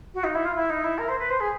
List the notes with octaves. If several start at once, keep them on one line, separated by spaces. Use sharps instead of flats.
F#4
D#4
E4
F4
E4
D#4
E4
A#4
C5
B4
C5
G#4